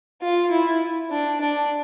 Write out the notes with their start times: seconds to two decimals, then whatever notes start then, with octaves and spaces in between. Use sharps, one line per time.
0.22 F4
0.51 E4
1.11 D4
1.41 D4